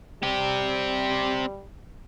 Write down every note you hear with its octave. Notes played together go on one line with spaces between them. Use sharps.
G3 C4 G4